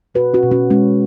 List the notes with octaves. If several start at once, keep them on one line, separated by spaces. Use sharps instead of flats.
B2 F#4 B4
C#4 F#4
B2
C#4 F#4
G#3 C#4